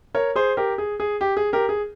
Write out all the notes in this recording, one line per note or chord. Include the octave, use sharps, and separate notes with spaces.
A#4 C#5
G#4 C5
G4 A#4
G#4
G#4
G4
G#4
G4 A#4
G#4